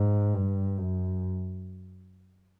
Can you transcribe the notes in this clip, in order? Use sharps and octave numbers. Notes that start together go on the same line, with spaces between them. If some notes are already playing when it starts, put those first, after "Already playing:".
Already playing: G#2
G2
F#2